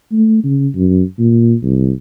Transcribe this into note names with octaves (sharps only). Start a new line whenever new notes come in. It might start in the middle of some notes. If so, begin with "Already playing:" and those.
A3
C#3
F#2
A#2
C2